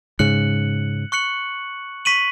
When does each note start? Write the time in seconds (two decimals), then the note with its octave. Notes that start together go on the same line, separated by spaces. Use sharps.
0.19 G#2 C#3 F#6 C#7 F#7
1.12 C#6 F#6 C#7 F#7
2.05 C#6 B6 D#7 F#7